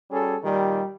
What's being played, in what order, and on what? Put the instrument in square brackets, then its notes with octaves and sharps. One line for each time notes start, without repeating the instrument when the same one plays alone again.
[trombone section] G3 C#4 F#4 G#4 A4
A#2 D#3 G3